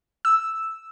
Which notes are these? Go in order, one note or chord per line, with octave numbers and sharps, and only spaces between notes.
E6